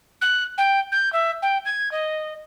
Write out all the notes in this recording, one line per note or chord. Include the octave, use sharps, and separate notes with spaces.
F#6
G5
G6
E5
G5
G#6
D#5